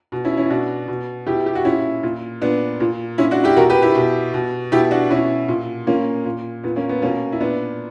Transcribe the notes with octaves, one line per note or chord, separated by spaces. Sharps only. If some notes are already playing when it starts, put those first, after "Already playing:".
B2
C#4 E4
C#4 E4
B2 D4 F#4
B2
B2 E4 G4
G4
F#4
A#2 C#4 E4
A#2
A#2 B3 D4
A#2
A#2 C#4 E4
D4 F#4
E4 G4
B2 F#4 A#4
G4 B4
E4 G4
B2
B2
B2 E4 G4
D4 F#4
B2 C#4 E4
A#2
A#2 A#3 C#4
A#2
A#2 B3
A#3 C#4
B3
B2 A#3 C#4
E4
A#2 B3 D4